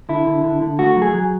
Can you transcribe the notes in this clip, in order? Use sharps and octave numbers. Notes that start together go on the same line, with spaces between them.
D3 E4
D3
D3
D3
A3 F#4
F#3
G#4
F#3